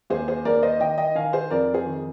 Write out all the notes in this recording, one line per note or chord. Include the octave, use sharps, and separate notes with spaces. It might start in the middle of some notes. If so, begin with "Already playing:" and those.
D#2 G#4 C5
G#4 C5
D#2 A#4 D5
C5 D#5
D#3 D#5 G5
D#5 G5
D#3 F5 G#5
G#4 C5
F2 A#4 D5
G#4 C5
D#3